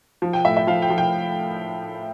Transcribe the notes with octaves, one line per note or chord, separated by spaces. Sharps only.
F3
G5
A2 E5
E5
F3 F5
G5
F3
G5